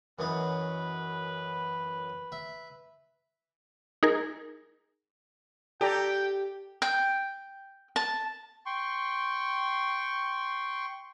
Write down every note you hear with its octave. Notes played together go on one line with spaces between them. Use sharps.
F#2 E3 D#4 B4
E5
D#4 G#4 A#4
G4 A4 D5 G5 A#5
G5
A5
G5 C6 C#6